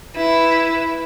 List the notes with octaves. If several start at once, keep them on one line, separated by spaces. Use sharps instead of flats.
E4 B4